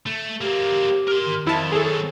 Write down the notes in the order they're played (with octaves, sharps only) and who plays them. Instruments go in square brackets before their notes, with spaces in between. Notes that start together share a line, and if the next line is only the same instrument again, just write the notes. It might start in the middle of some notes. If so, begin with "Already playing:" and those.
[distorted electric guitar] A3
[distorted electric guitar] A#3 C4 [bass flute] G4
[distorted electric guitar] A#4 C6
[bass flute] D#3
[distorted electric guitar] F2 [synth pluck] E4 A5
[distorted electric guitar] F#3 C4 [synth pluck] G#4 A4